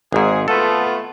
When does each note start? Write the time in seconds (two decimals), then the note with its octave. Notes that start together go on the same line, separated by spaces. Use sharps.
0.12 G#1 G#2 G#4
0.48 A3 B3 F4 A4